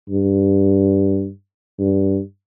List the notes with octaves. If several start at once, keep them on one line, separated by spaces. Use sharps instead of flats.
G2
G2